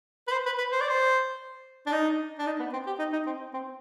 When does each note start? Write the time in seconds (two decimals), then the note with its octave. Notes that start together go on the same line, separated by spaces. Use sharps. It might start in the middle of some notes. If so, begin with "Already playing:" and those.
0.27 B4
0.32 C5
0.46 B4
0.58 B4
0.71 C5
0.81 D5
0.88 C5
1.86 D4
1.92 D#4
2.38 D4
2.46 D#4
2.59 B3
2.73 C4
2.87 G4
2.99 D#4
3.12 D#4
3.26 C4
3.53 C4